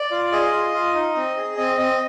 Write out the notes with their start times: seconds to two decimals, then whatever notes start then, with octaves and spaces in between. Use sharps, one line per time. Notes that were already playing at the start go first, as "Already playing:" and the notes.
Already playing: D5
0.11 F4
0.32 G#4 D#5
0.52 F4
0.73 F4
0.95 D#4
1.16 C4
1.36 G#4
1.57 C4 D#5
1.78 C4 D#5